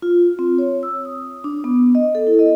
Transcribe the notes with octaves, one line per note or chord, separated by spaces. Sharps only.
F4
C4
C#5
E6
D#6
D4
B3
D#5
A4
E4
D#5